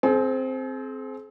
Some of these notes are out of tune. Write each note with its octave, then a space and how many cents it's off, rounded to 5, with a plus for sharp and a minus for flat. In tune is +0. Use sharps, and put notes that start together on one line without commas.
C4 +0 G#4 +40